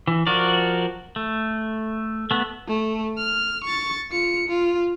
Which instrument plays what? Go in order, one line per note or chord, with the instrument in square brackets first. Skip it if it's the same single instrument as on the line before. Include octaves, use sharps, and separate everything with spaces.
[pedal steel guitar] E3
F3 F#4 A#4 D5
A3
A3 B3
[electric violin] A3
F6
C#6 A6
F4 C#7
F4